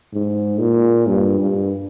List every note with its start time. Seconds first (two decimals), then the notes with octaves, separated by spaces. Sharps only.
0.13 G#2
0.60 A#2
1.07 G2
1.39 G2